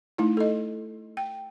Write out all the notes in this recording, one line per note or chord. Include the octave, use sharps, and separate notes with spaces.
A3 D#4 E4
A4 D#5
G5